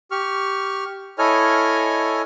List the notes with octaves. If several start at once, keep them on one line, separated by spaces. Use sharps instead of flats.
G4 C#6 F6
E4 A4 C#5 D#5 G#5 F6